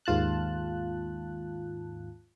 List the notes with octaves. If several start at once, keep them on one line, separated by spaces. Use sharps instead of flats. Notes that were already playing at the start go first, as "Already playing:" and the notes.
D#2 G#2 F4 A5 F#6